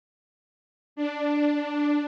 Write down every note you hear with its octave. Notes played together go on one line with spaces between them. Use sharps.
D4